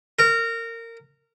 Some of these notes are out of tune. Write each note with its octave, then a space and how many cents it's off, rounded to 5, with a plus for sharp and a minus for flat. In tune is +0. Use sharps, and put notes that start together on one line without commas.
A#4 -20